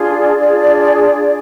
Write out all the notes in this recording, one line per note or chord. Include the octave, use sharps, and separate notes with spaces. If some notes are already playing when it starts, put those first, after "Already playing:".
Already playing: D4 F4 G#4 D5
D4 F4 G#4